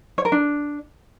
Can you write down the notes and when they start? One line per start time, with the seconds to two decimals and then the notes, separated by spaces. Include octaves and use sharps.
0.18 C#5
0.25 A#4
0.32 D4